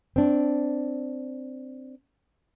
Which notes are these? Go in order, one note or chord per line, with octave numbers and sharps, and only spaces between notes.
C4 D4